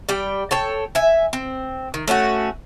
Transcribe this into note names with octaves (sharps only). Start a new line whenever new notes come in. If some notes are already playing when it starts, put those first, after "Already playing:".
G3 D5 G5
A4 C#5 G5
E5 G#5
C4
D#3
A3 C#4 F4 F#4